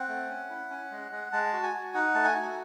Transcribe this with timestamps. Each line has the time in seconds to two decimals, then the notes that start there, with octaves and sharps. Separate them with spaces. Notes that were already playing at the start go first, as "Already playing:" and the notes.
Already playing: C4 F#5
0.09 A3
0.29 C#4
0.50 E4
0.70 C#4
0.91 G#3
1.11 G#3
1.33 G#3 A5
1.53 F#4
1.63 G#5
1.73 F#4
1.94 D#4 F#5
2.14 A3 A5
2.24 G#5
2.35 F#4